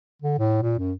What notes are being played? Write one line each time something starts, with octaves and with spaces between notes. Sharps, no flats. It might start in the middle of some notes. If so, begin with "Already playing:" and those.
D3
A2
A#2
F#2